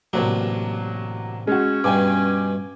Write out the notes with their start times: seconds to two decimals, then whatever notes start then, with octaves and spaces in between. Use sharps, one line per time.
0.13 A1 C3 F#3 A#3 D4
1.47 G#3 C#4 F#4
1.84 G2 B2 G5 G#5 D6